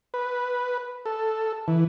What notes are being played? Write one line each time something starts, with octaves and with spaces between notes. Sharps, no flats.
B4
A4
E3